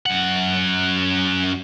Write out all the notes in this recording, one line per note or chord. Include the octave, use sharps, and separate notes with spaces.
F#2 F#5